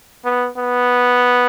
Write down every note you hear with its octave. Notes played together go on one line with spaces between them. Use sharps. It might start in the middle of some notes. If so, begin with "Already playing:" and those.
B3
B3